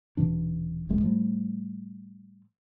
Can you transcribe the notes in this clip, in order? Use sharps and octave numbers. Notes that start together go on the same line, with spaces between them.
D#1 B2 E3 D4
D#1 A#1 G#3
A2 F3 G3 A3